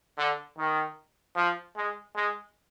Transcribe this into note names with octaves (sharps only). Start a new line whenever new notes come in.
D3
D#3
F3
G#3
G#3